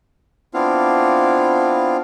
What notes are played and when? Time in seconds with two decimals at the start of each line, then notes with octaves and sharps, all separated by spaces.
0.54 B3 C4 D4 E4 F4 F5